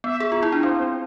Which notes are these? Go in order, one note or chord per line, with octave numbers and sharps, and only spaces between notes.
B3 E5
G#4
F4
E4
D4
C4 C5
C5